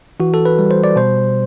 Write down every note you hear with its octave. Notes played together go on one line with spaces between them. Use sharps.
E3 F#4
A4
B4
G3
C5
D5
B2 C5